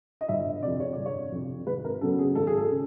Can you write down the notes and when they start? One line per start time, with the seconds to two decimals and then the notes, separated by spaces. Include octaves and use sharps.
0.21 D#5
0.28 G1 E5
0.46 D#5
0.63 F2 C3 D5
0.80 C#5
0.93 G1 D5
1.06 C#5
1.32 F2 C3
1.66 G#1 B4
1.85 A#4
2.01 F#2 C#3 F#3 B3 A4
2.19 G#4
2.35 G#1 A4
2.47 G#4
2.58 A4
2.71 C#3